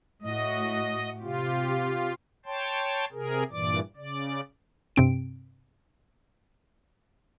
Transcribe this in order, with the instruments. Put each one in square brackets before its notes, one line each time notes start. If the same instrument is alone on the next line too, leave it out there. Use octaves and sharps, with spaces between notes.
[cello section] A2 A3 F#4 [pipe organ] D#5
[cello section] C3 G4 [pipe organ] F4
[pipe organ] C#5 G5 A5 C6
C3 G#4 A#4
G2 A#2 E3 D5 D6
C#3 D5
[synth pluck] G2 C3 C4 D7